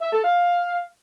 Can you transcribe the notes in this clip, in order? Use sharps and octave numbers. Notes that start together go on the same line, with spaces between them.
E5
A4
F5